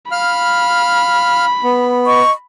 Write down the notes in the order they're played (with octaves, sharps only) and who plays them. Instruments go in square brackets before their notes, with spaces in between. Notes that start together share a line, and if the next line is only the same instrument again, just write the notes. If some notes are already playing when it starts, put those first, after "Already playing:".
[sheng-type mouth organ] F5 F6 [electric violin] B5
[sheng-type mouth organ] B3
[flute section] D#5 C#6